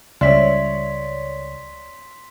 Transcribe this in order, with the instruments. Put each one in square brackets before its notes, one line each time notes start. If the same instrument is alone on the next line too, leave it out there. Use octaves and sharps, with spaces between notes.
[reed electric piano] C#2 [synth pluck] G3 E5 [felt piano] C#5 D5 [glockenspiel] C6 B6